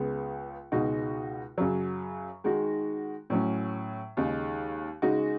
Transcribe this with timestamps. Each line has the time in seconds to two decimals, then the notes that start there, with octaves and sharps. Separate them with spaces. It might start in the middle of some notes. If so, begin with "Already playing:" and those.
Already playing: C#2 C#3 G#3 B3
0.72 C#2 B2 G#3 D#4 F#4
1.58 F#2 C#3 F#3
2.44 D#3 G#3 D#4 F#4
3.30 A2 F#3 C#4
4.17 D#2 C#3 G#3 D#4
5.02 C#3 G#3 D#4 F#4